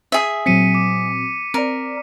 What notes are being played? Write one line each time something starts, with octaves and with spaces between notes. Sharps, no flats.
G#4 E5
A#2 F#3 C4 B6 C#7 D#7
D6
C4 A#4 D5